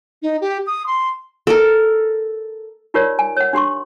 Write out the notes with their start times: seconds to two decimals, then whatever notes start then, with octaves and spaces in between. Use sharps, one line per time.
0.22 D#4
0.41 G4
0.67 D#6
0.87 C6
1.47 A4 A#4
2.94 D#4 F4 G4 A#4 C#5 D5
3.19 G#5
3.37 C#5 F#5
3.53 D4 G4 C6 C#6